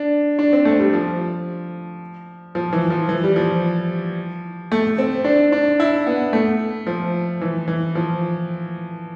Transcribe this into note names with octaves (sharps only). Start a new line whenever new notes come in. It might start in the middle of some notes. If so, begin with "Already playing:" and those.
Already playing: D4
D4
C4
A3
G3
F3
F3
E3
F3
E3
G3
F3
A3
C4
D4
D4
E4
B3
A3
F3
E3
E3
F3